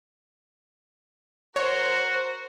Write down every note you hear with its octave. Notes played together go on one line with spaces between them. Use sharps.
F#4 A#4 C5 C#5